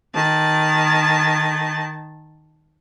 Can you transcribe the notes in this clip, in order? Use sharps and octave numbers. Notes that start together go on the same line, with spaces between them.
D#3 A5